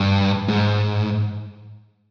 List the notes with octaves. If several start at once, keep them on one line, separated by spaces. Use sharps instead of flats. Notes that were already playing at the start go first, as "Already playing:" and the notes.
Already playing: G2
G#2